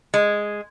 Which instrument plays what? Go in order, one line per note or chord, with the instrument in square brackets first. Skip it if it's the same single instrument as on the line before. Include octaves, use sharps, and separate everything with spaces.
[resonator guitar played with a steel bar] G#3